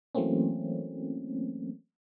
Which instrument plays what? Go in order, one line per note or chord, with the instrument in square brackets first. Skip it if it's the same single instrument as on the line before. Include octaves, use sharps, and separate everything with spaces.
[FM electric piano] E3 F#3 A3 A#3 C4 C#4